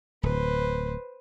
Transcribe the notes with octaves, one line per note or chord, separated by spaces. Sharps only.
D1 B4 C5